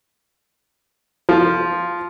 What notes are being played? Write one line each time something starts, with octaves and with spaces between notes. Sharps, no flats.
F3